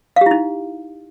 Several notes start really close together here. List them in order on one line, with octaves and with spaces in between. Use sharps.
F5 G4 E4 D#4